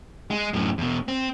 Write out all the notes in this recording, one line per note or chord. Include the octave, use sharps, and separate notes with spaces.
G#3
F#2 A2
E2 B2
C4